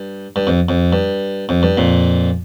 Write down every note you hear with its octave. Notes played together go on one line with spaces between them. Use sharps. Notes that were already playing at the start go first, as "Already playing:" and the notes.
Already playing: G2
G2
F2
F2
G2
F2
G2
F2 A#2